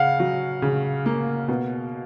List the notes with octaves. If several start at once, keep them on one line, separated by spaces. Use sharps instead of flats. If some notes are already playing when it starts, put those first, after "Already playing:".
Already playing: C#3 F5 F#5
F#3
C#3
A#3
B2